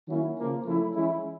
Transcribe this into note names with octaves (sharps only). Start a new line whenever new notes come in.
D#3 F#3 A#3 C#4 E4
C#3 F3 A#3
F3 A3 C#4 E4
E3 G#3 C#4 E4